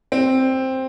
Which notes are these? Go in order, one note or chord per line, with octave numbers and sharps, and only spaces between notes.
C4